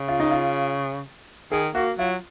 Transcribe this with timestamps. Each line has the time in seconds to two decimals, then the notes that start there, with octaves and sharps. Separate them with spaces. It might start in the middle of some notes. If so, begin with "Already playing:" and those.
Already playing: C#3
0.08 F4
0.20 D#4
0.31 F4
1.52 D#3 G#4
1.75 A#3 F#4
1.99 F#3 F4